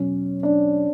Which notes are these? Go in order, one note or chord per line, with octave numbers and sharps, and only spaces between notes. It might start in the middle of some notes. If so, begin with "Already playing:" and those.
Already playing: E2 B2 F#3 C#4
D4